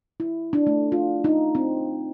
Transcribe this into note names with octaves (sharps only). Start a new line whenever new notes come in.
E4
D4
A3
F4
D#4
C4